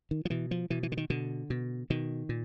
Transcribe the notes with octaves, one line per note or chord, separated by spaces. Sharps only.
D#3
F3
B2 E3
F3
B2 E3
E3
D3
D#3
B2 D3
B2
B2 D#3
A#2